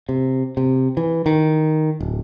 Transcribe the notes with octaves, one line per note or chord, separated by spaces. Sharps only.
C3
C3
E3
D#3
D1